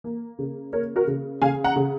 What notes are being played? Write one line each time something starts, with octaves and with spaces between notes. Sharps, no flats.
A#3
C#3
A#3 A#4 C#5
F#4 A#4
C#3
C#3 F5 G#5
F#5 A#5
C#3